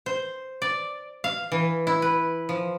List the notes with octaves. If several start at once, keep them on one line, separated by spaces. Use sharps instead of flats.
C5
D5
F5
E3
E4
B4
F3